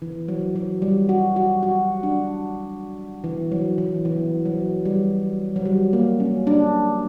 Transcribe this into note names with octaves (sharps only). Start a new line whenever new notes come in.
E3
F#3
F#3
G3
F#4
F#4
F#4
D4
E3
F#3
E3
E3
F#3
G3
F#3
G3
A#3
C#4
D4